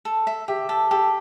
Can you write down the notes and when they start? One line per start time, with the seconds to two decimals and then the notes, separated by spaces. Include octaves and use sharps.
0.05 A4
0.27 E5
0.48 G4 E5
0.69 A4
0.91 G4 A4